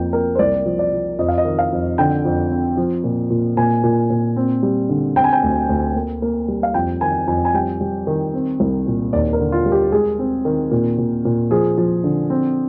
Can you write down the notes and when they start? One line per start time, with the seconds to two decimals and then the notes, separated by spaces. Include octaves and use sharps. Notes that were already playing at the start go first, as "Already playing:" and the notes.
Already playing: F2 A#3 G5
0.13 A#3 A#4
0.35 C5
0.39 C2 D5
0.66 F3
0.79 D5
0.92 F3
1.19 F2 D#5
1.28 F5
1.38 D#5
1.45 D#3
1.59 F5
1.72 F2
1.98 D3 G5
2.25 F2
2.51 C4
2.77 F3
3.04 A#2
3.30 A#2
3.57 A#2 G#5
3.84 A#2
4.10 A#2
4.36 C4
4.63 G3
4.89 D3
5.16 C4 G5
5.24 G#5
5.33 G5
5.43 D2
5.69 D2
5.95 A#3
6.22 A#3
6.48 G3
6.63 F5
6.74 F2 G5
7.01 D#3 G#5
7.28 F2 G#5
7.45 G#5
7.54 G3 G5
7.81 G3
8.07 D#3
8.34 C4
8.60 C2
8.87 A#2
9.13 D#2 D5
9.33 A#4
9.39 D3
9.52 F4
9.66 G3
9.72 G4
9.92 G#3 G#4
10.19 C4
10.45 D#3
10.71 A#2
10.98 A#2
11.25 A#2
11.51 F3 G#4
11.78 F3
12.04 D3
12.30 C4